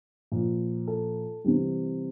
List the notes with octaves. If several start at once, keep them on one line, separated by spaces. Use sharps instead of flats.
A#2 F3
A4
C3 E3 G3